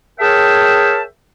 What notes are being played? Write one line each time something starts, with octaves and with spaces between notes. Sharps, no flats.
G#4 A#4 C#5 E5 G5 A5